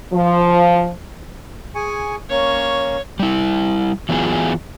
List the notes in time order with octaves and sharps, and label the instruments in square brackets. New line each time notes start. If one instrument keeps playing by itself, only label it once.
[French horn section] F3
[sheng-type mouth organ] G#4 G#5 C#6
[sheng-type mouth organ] A#3 C#4 [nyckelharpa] C#5
[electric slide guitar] G3 E4
E3 F#3 B3 F4 G#4